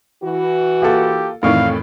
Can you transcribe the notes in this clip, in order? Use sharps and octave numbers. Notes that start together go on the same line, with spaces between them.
E3 F#4
A#3 F4 G4 A4
F2 A2 D#3 E3 D5 F5 C#6